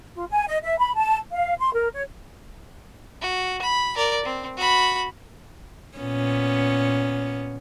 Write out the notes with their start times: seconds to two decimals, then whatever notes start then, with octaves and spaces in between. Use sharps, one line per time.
0.14 F4
0.30 G#5
0.48 D#5
0.62 E5
0.79 B5
0.96 A5
1.31 F5
1.59 C6
1.74 A#4
1.93 C#5
3.22 F#4
3.62 B5
3.96 A#4 D5
4.25 C4
4.57 F#4 B5
5.98 A#2 B3 C#4